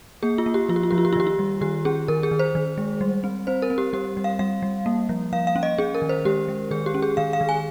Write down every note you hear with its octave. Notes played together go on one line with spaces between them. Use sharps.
A#3 G#4
F4
A#3
G4
F3 F4
G4
F4
F3 G4
F4
G4
F4
D#3 G4
F4
G3
D#3 G4
C#4 G#4
D#3 A#4
G#4
D#3
C5
D#3
G#3
G3
C4
C4 C5
A#4
C4
G4
G3 G4
G3
F5
G3 F5
G3
A#3
F3
F3 F5
F5
C#4
D#5
C#4 G#4
A#4
D#3
C5
G#3 G4
G#3
D#3 G#4
G4
C#4
G#4
D#3 F5
F5
D#3
G#5